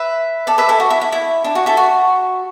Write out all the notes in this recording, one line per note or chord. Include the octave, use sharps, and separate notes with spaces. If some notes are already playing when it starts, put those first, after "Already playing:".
Already playing: B4 E5
A4 D5
B4 E5
E4 A4
F#4
E4
E4
E4
D4
F#4
E4 A4
F#4